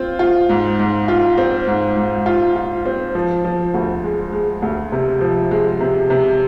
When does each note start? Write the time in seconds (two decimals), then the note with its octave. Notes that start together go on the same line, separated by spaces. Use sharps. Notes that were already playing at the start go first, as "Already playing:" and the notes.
Already playing: C4 F4
0.19 F4
0.49 G#2
0.79 G#2
1.08 F4
1.38 C4
1.67 G#2
1.97 G#2
2.26 F4
2.56 F4
2.86 C4
3.15 F3
3.44 F3
3.74 D2
4.04 G#3
4.32 G#3
4.62 D2
4.92 C3
5.21 F3
5.51 G#3
5.80 C3
6.10 C3